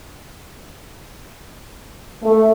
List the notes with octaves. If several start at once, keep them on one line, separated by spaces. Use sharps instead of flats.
A3